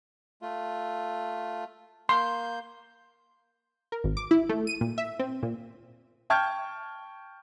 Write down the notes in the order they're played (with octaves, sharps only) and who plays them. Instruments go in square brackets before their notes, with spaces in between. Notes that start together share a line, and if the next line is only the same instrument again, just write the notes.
[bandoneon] A3 F4
[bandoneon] A#3 G6 [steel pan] C6
[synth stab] A#4
G#1
D6
E4
A3
D#7
A#2
E5
C4
A#2
[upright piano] G5 A5 C#6 F6 G6 G#6